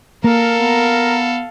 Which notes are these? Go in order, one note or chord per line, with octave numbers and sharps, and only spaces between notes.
A#3 A4 A#4 F5
B3